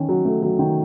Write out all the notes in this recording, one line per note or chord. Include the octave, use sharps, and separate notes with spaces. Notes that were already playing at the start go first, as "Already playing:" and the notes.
Already playing: D#3 C#4
F#3
A3
F#3
D#3